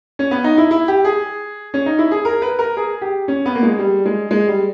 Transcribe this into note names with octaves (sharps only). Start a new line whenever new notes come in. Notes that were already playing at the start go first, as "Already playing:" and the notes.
C#4
B3
D#4
E4
E4
G4
G#4
C#4
D#4
E4
G#4
A#4
B4
A#4
G#4
G4
C#4
B3
A#3
G#3
G3
G#3
G#3
G3